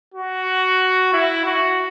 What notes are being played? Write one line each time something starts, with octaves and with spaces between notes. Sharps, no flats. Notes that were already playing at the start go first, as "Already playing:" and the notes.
F#4
E4
F#4